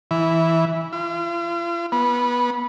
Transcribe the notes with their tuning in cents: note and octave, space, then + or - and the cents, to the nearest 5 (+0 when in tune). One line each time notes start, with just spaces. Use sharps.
E3 -5
F4 -40
B3 -20